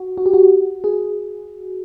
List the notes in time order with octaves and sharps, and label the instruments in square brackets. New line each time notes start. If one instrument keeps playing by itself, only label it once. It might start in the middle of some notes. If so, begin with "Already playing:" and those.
Already playing: [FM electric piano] F#4
F#4
G4
F#4
G#4